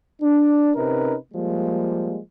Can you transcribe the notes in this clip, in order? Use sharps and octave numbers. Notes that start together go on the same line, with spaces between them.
D4
C3 C#4 D#4 A#4 B4
F3 G3 G#3 A#3